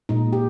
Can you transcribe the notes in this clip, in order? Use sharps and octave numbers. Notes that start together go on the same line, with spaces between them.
A#2 G#3 D#4
G4